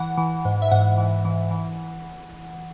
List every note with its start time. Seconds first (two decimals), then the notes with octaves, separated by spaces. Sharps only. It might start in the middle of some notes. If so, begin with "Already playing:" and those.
Already playing: E3 F#5
0.18 E3
0.45 G#2
0.62 E5
0.71 G#2 F#5
0.98 E3
1.25 E3
1.51 E3